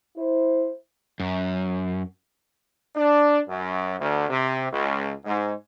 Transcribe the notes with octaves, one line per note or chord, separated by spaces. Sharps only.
E4 C5
F#2
D4
F#2
D2
C3
C#2
G#2